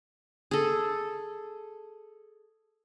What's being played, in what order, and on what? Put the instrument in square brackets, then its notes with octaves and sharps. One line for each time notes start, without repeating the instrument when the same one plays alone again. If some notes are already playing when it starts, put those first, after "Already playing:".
[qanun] G#4 A4